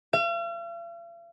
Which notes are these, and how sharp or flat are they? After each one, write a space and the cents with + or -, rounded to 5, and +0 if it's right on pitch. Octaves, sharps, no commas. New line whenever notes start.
F5 -45